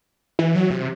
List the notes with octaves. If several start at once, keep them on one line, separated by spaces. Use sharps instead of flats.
E3
F#3
C3